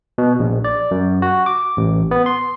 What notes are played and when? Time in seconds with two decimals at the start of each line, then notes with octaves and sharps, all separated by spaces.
0.18 B2
0.39 A#1
0.64 D5
0.91 F#2
1.22 F#4
1.46 D6
1.77 A1
2.11 B3
2.26 C6